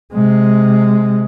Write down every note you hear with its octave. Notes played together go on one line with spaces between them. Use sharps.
C3 G#3